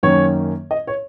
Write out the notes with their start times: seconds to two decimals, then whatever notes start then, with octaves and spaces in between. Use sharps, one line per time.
0.03 F#2 D#3 A#3 C#4 C#5
0.71 D#5
0.87 C#5